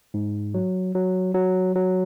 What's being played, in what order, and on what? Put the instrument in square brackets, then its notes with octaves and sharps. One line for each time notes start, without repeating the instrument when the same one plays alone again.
[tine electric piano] G#2
F#3
F#3
F#3
F#3